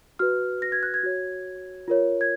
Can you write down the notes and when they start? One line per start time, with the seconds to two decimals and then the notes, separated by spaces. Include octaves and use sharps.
0.19 F#4 B4 F6
0.62 A#6
0.72 G#6
0.83 F#6
0.94 G#6
1.03 F#4 C#5
1.88 F4 A#4 C#5
2.21 G#6